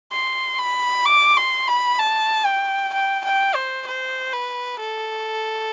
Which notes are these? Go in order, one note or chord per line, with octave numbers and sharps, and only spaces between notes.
C6
B5
D6
C6
B5
A5
G5
G5
G5
C5
C5
B4
A4